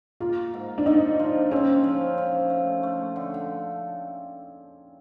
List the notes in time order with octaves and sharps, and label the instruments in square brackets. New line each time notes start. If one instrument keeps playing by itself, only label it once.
[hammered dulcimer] A#3 [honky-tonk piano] F4
[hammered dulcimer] G#2
[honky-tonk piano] D4
[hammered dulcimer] G#2 [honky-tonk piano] D#4
[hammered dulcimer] F3
[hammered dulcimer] C4 [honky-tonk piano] C#4
[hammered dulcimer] F3
F3
A3
A3
D3